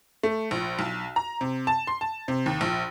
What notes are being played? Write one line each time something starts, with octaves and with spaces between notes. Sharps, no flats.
A3
A#1
B1
A#5
C3
A5
C6
A5
C3
D#2
A#1